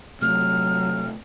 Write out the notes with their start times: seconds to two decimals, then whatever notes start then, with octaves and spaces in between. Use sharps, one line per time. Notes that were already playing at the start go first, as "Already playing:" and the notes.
0.22 C3 F#3 A3 F6